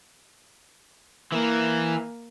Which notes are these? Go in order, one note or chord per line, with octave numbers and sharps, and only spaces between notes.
E3 A#3